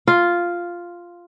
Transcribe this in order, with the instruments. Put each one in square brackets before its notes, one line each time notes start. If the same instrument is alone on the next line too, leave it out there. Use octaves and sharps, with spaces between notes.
[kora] F4